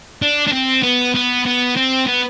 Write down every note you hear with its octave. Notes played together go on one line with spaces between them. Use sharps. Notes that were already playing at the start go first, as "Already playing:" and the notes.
D4
D4
C4
B3
B3
B3
C4
B3